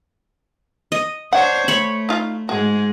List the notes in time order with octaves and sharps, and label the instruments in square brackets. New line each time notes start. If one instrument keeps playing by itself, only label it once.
[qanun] D#5
[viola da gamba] D4 C5 C#5 [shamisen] F#5
[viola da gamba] A3 [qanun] C#5 B5
[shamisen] D#4 F4
[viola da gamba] G#2 G#3 [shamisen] F#4